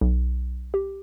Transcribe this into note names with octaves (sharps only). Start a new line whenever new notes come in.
B1
G4